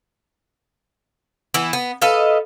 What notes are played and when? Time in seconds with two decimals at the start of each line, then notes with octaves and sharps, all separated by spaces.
1.54 E3 B3 E4
1.73 B3
2.02 A4 B4 D#5 F5